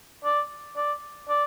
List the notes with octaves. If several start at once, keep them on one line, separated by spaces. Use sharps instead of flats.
D5
D5
D5